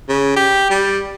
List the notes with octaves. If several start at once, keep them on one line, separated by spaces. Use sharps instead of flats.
C#3
G4
G3